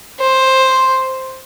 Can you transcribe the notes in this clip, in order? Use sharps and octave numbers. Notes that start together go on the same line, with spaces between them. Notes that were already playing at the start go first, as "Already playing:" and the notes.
C5